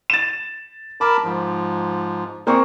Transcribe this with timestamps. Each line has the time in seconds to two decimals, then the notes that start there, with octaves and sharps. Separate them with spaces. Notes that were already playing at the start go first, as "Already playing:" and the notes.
0.10 A6 E7
1.01 A#4 A5 B5 D6
1.24 G#2 F3
2.47 A#3 C4 G#4 C#6